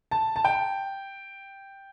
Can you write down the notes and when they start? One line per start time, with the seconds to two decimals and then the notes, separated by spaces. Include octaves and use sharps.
0.11 A5
0.36 A5
0.45 G5